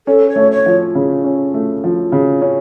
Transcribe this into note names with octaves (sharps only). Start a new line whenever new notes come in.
C#4 A4
C#5
A3
C#5
F3
C#3
C#4
A3
F3
C#3
C#4